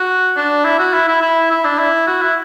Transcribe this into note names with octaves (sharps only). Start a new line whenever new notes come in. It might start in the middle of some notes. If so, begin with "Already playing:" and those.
Already playing: F#4
D4
E4
F#4
E4
E4
E4
E4
D4
E4
F#4
E4